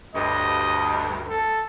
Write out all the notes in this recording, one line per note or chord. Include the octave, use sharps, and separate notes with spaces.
D2 G2 D#5
A4